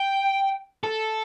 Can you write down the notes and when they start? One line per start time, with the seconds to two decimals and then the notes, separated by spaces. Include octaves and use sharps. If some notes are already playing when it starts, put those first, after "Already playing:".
Already playing: G5
0.84 A4